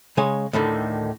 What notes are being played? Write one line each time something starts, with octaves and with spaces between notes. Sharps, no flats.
C#3 G#3 C#5 G#5
D2 A2 D3 D#3